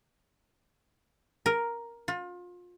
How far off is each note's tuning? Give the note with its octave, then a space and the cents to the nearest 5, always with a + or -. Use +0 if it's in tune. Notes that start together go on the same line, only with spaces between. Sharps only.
A#4 +5
F4 +30